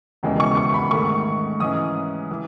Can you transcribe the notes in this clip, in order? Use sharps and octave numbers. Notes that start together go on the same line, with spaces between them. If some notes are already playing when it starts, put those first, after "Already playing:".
E1 D#2 C#3 E3 G#3
C#6
C#6
B5
G#2 D#3 A3 C#6
G#2 E3 G#3 C#4 D#6
E3